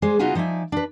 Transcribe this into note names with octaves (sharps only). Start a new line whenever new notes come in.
G#3 G#4 C5 D5
C#3 B3 D#4 F4 F#4 G#4
F3 D#4 D5 E5 G#5
D4 B4